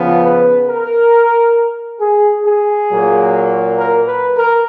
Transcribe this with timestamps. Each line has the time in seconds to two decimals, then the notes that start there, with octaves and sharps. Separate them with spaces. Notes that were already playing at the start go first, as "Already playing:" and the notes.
Already playing: C#3 F3 B3
0.25 B4
0.69 A#4
2.01 G#4
2.46 G#4
2.90 A#2 F#3 A#3
3.78 A#4
4.07 B4
4.37 A#4